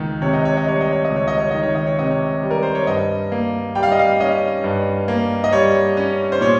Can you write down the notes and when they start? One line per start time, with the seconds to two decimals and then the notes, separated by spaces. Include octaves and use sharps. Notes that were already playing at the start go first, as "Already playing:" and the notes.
Already playing: C#2 D#3
0.22 C3 C#5
0.33 D#5
0.45 C#5
0.57 D#5
0.66 G3 C#5
0.81 D#5
0.92 C#5
1.05 D#5
1.10 C#2
1.16 C#5
1.28 D#5
1.40 C#5
1.51 D#3 D#5
1.63 C#5
1.75 D#5
1.86 C#5
1.99 C3 D#5
2.11 C#5
2.43 G3
2.51 A#4
2.63 C5
2.75 C#5
2.87 G2 D#5
3.32 A#3
3.75 G3 G5
3.83 F5
3.92 D#5
3.99 F5
4.20 C#4 D#5
4.64 G2
5.08 A#3
5.44 D#5
5.52 G3 C#5
5.97 C#4
6.32 C5
6.41 A#2 C#5